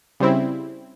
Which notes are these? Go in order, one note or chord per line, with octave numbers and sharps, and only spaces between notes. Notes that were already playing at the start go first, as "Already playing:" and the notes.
C#3 G3 C4 E4